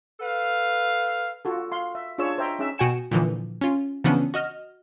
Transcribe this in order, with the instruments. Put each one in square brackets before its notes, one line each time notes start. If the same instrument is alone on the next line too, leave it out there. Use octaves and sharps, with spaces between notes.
[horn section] A4 B4 F5
[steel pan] F4 F#4 A4
F5 C6
E5
D4 F4 G#4 C#5 E6
C5 D#5 E5 G5 A#5 C6
C#4 D#4 G#4 E5 E6
[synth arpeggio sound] B2 F#4 G5 G#5 C#7 E7
A#2 D3 E3 F3
C#4 F4
C#3 E3 F3 B3 C#4 D4
F#4 D#5 F6